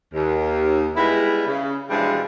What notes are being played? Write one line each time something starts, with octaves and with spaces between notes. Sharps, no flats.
D#2
G3 G#3 B3 E4
C#3
B2 E3 F3 G3 G#3 D4